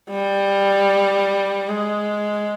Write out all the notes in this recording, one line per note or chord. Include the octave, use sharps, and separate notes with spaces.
G3
G#3